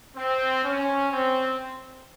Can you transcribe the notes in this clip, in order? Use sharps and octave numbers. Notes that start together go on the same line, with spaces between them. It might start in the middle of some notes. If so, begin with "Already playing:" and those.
C4
C#4
C4